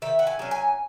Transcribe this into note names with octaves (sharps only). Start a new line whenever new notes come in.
D#3 E5
F#5
G#5
F#3 C#4
G#5